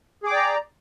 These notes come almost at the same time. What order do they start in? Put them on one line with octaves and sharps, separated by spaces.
G#4 D6 G5 D5 A#5